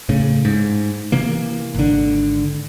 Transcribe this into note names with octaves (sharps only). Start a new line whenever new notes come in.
A2 C#3
G#2
C3 E3 A#3
G#1 D3